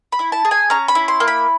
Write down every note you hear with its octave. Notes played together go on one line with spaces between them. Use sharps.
B5
E4
A5
G#4
G#5
C#4 A#5
B5
E4
C6
A#3
B5